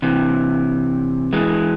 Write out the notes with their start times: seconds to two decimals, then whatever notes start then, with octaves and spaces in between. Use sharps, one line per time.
0.02 C3 E3
1.33 E3 G#3